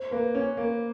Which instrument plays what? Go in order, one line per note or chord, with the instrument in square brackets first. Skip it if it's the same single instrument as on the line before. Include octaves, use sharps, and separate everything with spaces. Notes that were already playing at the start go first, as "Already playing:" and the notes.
Already playing: [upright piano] C5
[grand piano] A#3 [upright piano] B4
[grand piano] C#4
A#3